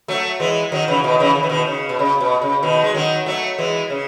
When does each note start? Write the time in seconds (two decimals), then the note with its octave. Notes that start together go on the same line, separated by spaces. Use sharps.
0.08 F#3 A3
0.40 E3 G#3
0.72 D#3 F#3
0.88 C#3 E3
1.04 B2 D#3
1.20 C#3 E3
1.36 D#3
1.43 E3
1.49 B2 D#3
1.67 C#3
1.89 B2
1.99 C#3
2.21 B2
2.42 C#3
2.62 B2 D#3
2.84 G#3
2.94 D#3 F#3
3.26 F#3 A3
3.58 E3 G#3
3.90 C#3